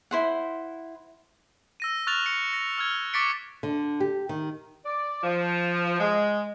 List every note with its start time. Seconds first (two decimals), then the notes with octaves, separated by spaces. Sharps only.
0.11 E4 C5 F#5
1.80 E6 A#6 D#7
2.07 C#6 F6 F#6 A6 F7
2.26 C#7
2.53 A#6
2.78 E6 F6 G#6
3.13 C#6 D6 A6 B6 C#7 D7
3.63 D3
4.00 G4
4.29 D#3
4.85 D5
5.23 F3
6.00 G#3